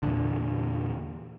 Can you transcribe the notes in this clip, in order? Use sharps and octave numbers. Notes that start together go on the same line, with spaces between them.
E2 A#2 D3